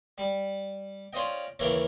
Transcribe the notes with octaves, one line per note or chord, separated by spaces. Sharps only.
G3
C#4 F4 C5 D5 D#5 G5
D#2 C#3 E3 A#4 C#5 D6